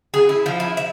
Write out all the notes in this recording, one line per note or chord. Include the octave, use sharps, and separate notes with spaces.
G#4
E4
F3
E4
E5